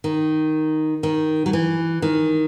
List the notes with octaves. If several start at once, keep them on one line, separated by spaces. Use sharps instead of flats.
D#3
D#3
F#3
E3
D#3